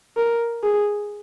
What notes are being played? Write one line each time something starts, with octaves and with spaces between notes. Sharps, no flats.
A#4
G#4